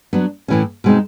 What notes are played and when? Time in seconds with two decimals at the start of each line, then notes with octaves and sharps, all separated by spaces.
0.13 F#3 B3 D4
0.48 A2 E3 A3 C#4
0.84 B2 G#3 C4 D#4